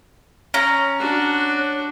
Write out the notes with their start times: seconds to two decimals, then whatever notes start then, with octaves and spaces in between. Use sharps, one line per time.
0.54 C#4 A#5
0.99 D4 F#4